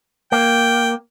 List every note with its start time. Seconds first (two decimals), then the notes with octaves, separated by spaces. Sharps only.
0.32 A#3 G5